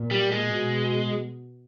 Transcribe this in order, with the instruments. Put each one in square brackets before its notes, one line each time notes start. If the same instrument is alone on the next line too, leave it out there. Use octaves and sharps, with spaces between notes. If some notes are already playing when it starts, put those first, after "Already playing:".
Already playing: [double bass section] A#2
[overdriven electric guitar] G3
G#3
[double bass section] B2